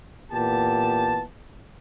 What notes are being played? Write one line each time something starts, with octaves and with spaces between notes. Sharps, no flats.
A#2 E3 B3 G4 A5